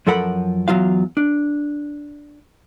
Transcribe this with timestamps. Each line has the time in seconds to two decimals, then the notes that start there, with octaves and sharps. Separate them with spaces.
0.07 F#2 F3 A4 A#4 F#5 B5
0.68 E2 F#3 F4 F5
1.17 D4